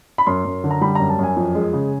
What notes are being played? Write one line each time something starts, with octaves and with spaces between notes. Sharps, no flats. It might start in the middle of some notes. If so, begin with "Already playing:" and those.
B5
F#2 C6
F#2
D3
A#5
G3 B5
F#2 A#5
A5
F#2 G#5
F2
G#3
C#3